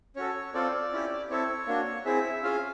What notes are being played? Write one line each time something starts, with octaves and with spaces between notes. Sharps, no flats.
C#4 F#4 A4 C#5
C4 F4 A4 D5
C#4 E4 G4
C4 E4 A4 C#5
A#3 D4 F#4
C4 E4 G#4 E5
C#4 F4 G#4 F5